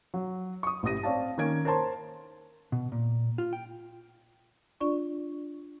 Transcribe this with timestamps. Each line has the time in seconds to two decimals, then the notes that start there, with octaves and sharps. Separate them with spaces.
0.14 F#3
0.63 C#6 D#6
0.83 A1 E4 G4 D#6 A#6 D#7
1.03 C4 C#5 D5 F5 A5
1.38 D#3 A#3 C#4 G#6 D7
1.65 A#4 C5 C#5 A5 C6
2.72 B2
2.92 A#2
3.38 F4
3.53 G5
4.81 D4 F4 D5 C#6